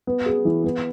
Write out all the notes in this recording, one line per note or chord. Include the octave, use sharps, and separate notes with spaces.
B3
G#4
E3
B3